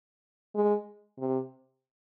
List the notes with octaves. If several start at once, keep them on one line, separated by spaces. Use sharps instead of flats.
G#3
C3